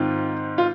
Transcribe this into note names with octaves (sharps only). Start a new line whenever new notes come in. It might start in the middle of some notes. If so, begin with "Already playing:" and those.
Already playing: G#2 D#3 C4 D#4 F4
F4